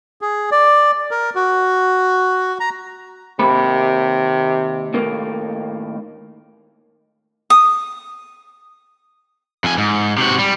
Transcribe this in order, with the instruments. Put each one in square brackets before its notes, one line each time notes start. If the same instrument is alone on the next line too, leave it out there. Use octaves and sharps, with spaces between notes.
[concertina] G#4
D5
A#4
F#4
A#5
[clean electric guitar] D#2 A#3 B5 [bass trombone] C3
[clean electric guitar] D#2 A2 A#3
[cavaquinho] D#6
[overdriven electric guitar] F2 G#5
G#2
C3 F#4
G3